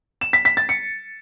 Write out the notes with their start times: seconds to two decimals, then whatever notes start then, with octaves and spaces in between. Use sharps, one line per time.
0.21 E7
0.33 B6
0.45 B6
0.57 A6
0.69 C#7